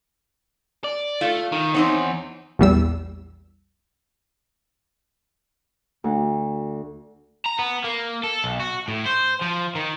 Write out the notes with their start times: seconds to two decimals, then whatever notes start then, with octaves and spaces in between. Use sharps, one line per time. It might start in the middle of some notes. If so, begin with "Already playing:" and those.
0.84 D5
1.21 A3 F4
1.52 D#3
1.74 E2 C4 D#4 C#5
2.59 A#1 E2 G3 E6
6.04 D2
7.46 A#5
7.59 B3
7.84 A#3
8.24 A4
8.44 B1
8.60 F#4
8.88 A2
9.06 C5
9.41 F3
9.75 D#3